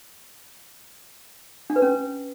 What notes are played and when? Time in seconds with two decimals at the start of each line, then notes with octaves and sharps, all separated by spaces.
1.70 D4
1.76 B4
1.82 C#4